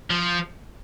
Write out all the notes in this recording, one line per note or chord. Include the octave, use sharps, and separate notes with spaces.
F3